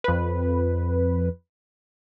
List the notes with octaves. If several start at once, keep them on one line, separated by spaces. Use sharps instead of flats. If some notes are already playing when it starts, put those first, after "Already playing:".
F2 B4